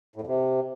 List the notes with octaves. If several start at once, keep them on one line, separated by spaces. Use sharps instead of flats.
A2
F2
C3